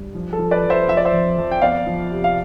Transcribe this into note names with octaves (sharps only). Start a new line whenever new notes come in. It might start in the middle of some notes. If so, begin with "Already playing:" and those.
Already playing: G2
F3
A4
F3
B4 D5
F2
C5 E5
F3 E5
D5
C5 E5
F2
F2
G5
B3 D5 F5
F3
C3
F5